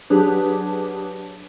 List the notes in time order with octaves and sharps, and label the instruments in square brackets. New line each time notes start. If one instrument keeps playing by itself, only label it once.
[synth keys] F#3 D4 G4 G#4 B4